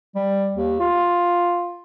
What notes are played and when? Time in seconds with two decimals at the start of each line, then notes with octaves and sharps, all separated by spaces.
0.15 G3
0.55 D#2
0.80 F4